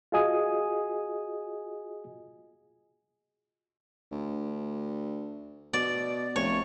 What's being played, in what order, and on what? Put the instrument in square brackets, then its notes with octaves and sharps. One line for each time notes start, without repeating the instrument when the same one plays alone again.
[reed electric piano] F4 F#4 G#4 D#5 G#5 D#6
[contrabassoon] D2
[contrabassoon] B2 [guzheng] D5
[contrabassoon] F1 [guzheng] C#5